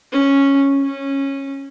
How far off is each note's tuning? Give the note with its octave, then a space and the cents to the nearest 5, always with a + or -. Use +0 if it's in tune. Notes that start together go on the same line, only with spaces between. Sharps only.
C#4 -5
C#4 -15